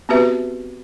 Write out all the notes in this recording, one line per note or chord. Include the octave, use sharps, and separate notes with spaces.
B3 C4 F#4 G4 B4 E5